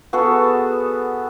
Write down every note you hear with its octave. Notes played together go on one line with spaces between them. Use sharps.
B3 F#4 G#4 A4